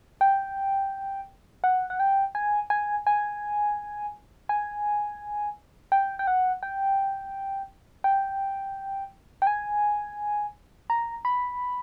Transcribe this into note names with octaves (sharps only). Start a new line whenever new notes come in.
G5
F#5
F#5
G5
G#5
G#5
G#5
G#5
G5
G5
F#5
G5
G5
G5
G#5
A#5
B5